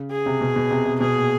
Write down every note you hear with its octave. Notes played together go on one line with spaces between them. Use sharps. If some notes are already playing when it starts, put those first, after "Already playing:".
Already playing: C#3
G#4
C3
B2
B2
C3
C3
B2 G#4
A#2